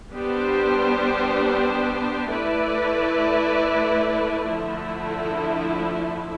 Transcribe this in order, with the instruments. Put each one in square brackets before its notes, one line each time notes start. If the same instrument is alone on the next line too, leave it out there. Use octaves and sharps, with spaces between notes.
[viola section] G3 B3 D4 G4 C5
A3 E4 B4 D5
D3 F3 A3 E4